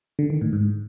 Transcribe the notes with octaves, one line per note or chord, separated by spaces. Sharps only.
D3
D#3
A2
G#2